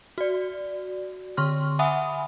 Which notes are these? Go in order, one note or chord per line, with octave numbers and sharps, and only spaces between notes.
F#4 D5
D3 C6 C#6 F6
E5 F#5 G#5 B5 D#6